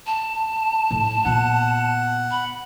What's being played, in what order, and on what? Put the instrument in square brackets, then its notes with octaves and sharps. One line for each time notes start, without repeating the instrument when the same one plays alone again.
[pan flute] A5
[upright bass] A2
[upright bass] A#2 B3 [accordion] F#5
[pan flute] B5